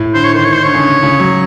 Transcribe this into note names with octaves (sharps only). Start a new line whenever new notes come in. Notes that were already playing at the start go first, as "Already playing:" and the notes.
Already playing: A2
D3 C5
C#5
D#3 C5
C#5
C5
D3 C#5
C#3
C#3
F#3